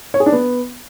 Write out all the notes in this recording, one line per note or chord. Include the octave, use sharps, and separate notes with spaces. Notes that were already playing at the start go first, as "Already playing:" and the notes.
C#5
G#4
D4
B3